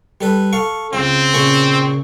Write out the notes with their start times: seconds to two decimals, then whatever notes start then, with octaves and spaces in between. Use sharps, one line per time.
0.21 G3 A4 B4
0.53 A4 F5 C#6
0.93 C#2 C4 F4
1.33 A#2 C#3 C#6